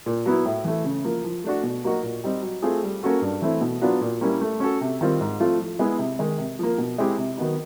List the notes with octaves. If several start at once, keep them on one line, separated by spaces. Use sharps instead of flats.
A#2
F#3 B3 E4
A2
E3 A3
C#3
F3 A#3
F3
A3 D4 F#4
B2
F#3 A#3 D#4 F#4
A#2
G3 C4 D#4
F#3
A3 C4 F4 G#4
G3
A#3 C#4 F#4 A4
G2
E3 A3 C4 E4
B2
F#3 B3 D4 F4
A#2
G3 A#3 C#4 E4
A3
C#4 F#4 A4
C3
D#3 G3 C4 F4
G#2
F3 A3 C4 F4
F3
G#3 B3 E4 G#4
C3
D#3 G#3
C3
F3 A#3
B2
G#3 C4 E4 G4
C3
D#3 F#3 B3 D#4